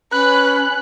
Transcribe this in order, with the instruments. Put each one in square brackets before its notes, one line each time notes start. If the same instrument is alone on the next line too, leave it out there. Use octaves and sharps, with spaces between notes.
[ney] C#4 [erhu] B4 [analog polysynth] F#6